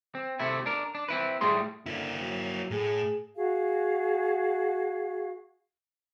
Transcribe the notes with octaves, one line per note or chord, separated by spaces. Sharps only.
C4
C3 A3 E4
D4 A#4
D4
C4 E4 B4
A2 G3 A3 G#4 C6
D3 A#3 E4
F#3
A2 G#4
F#4 G#4 F5